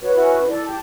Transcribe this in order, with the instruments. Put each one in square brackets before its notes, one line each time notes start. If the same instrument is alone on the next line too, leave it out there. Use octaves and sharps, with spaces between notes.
[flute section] F#4 C#5 [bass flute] B4
[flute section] C#4 E4 F#4
[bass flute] E4 [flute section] A4 D5
[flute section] G4 A5